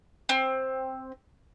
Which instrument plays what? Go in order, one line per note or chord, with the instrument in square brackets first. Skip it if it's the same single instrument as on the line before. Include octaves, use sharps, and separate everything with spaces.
[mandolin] C4